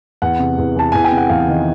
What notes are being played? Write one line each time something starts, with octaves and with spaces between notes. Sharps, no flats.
E2 F#5
C3
E2
E3 A5
E2 G#5
G5
C3
F#5
E2 F5
D#3